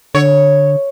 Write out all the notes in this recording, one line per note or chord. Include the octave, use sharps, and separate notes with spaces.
D3 C#5